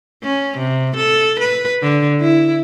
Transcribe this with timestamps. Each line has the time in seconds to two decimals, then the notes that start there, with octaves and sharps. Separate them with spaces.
0.24 C#4
0.58 C3
0.97 A4
1.40 B4
1.82 D3
2.20 E4